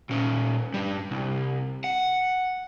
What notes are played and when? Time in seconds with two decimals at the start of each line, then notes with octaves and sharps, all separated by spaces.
0.09 A#2 C#4
0.74 G2 G3
1.11 C2
1.84 F#5